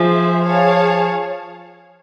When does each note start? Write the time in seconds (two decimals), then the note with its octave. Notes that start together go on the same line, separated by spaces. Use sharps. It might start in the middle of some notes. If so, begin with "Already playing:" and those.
Already playing: F3 G#4 C5 E5
0.46 G#4 C#5 F5 A5